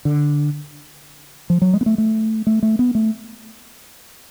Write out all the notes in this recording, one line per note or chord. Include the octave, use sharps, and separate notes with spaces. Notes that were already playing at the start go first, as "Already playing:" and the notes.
D3
F3
F#3
G#3
B3
A3
A3
A3
A3
B3
A3